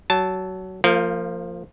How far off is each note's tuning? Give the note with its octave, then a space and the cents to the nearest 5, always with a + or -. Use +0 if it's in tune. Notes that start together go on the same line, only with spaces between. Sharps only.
F#3 +20 A5 +0
F3 +0 A#3 -35 F5 +15